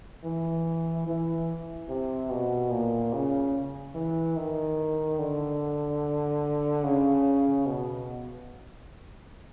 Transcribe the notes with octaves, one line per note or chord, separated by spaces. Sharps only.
E3
E3
C3
B2
A#2
C#3
E3
D#3
D3
C#3
B2